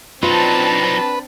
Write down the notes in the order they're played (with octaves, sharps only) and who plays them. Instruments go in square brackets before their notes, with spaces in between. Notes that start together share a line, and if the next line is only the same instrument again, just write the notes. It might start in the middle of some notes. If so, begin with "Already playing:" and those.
[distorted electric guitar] F#3 D#4 [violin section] C4 D4 A5 [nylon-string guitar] F4 [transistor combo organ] B4